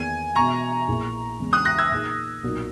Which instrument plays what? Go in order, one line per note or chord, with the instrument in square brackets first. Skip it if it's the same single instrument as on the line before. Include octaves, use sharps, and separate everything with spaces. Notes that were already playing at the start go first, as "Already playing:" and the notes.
Already playing: [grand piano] E2 D#3 A#3 [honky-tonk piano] G#5
[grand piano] E1 E2 B2 [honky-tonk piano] A#5 C#6
[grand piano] A#1 A#2 A#3 E4 G#4
E2 C#3 E3 G#3
[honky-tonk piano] D#6 F#6
F#6 A#6
E6 G#6
[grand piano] A#2 A#3 D#4 G#4
B1 A#2 F#3 A#3 D#4